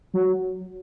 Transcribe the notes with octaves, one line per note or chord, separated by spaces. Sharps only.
F#3